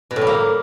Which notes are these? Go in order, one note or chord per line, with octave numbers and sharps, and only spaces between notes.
B2
A2
G3
A#3